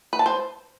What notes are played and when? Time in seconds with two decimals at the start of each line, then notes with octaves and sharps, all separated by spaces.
0.13 B4
0.19 A5
0.26 C5